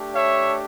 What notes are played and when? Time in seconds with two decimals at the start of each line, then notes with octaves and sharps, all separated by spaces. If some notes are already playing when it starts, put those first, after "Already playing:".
Already playing: A3 D4 G4
0.14 C#5 E5